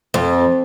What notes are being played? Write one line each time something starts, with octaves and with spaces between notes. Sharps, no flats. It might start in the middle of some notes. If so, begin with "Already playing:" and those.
F2